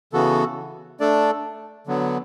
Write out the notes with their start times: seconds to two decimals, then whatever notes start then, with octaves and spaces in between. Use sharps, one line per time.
0.13 C#3 E3 B3 F#4 A4
1.00 A3 D4 A4 D5
1.87 D3 F#3 B3